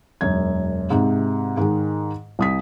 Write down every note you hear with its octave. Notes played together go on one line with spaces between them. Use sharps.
E1 F#2 G#6
G#2 C3
G#2 D#3 G#3
C2 D#6 B6